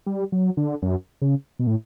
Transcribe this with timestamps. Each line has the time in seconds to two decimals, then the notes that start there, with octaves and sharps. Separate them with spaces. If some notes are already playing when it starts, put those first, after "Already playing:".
0.07 G3
0.32 F#3
0.57 D3
0.82 F#2
1.22 C#3
1.59 B2
1.67 A2